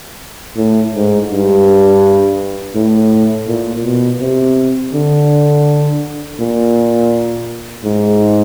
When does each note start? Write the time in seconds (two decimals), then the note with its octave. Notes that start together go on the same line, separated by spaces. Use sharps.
0.57 A2
0.94 G#2
1.30 G2
2.75 A2
3.48 A#2
3.84 B2
4.21 C3
4.94 D3
6.40 A#2
7.84 G#2